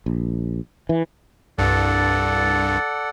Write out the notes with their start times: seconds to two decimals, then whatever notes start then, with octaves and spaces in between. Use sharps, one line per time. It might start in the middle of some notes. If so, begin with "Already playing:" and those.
0.06 A#1
0.89 E3
1.58 C2 G2 A4 D5 F#5